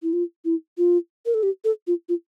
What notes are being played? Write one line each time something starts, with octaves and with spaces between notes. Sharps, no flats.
E4
F4
E4
F4
A#4
A4
G4
A4
F4
F4